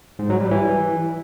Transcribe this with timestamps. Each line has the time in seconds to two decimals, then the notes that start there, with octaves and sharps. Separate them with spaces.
0.19 G#2
0.30 F#3
0.40 G3
0.51 E3